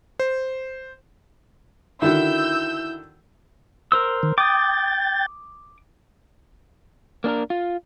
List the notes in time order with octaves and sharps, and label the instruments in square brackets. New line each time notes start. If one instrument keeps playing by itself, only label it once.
[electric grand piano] C5
[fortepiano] D3 D#3 F#4 [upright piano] E4 [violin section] E6 G6
[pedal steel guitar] A#4 C5 E6
[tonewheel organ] D#3
[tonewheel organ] G5 G6 A6 [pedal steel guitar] D6 D#6
[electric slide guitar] A#3 D4 A4 A#4
F4